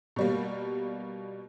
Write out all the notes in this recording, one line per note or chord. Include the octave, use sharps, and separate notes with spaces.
B2 G3 A#3